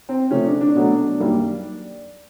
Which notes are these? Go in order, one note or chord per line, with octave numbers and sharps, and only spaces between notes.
C4
C3 F3 A3 C#4
D4
D4
B2 F#3 A3
F#2 D#3 G3 A#3